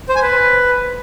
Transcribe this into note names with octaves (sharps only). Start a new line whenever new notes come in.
C5
G#5
B4